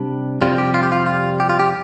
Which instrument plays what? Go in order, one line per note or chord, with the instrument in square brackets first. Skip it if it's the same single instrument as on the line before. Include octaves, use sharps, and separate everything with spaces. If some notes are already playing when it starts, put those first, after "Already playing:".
Already playing: [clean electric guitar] C3 G3 D4
F2 C3 G3 F4
G4
F4
G4
F4
F4
G4
F4
G4